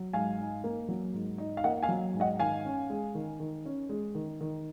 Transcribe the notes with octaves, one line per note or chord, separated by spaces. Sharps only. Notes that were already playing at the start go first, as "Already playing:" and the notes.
Already playing: F#3
G#2 F5 G#5
D#4
A#3
F#3
G#2
D#4
F5
A#3 D#5 F#5
F5 G#5
F#3
G#2
D#5 F#5
D#3 F5 G#5
C#4
G#3
D#3
D#3
C#4
G#3
D#3
D#3